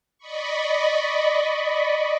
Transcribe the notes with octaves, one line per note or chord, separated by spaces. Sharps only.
D5 D#5 B5 C#6